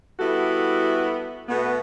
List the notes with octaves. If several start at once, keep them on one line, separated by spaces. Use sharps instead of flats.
G3 B3 E4 F#4 A4
B2 A3 B3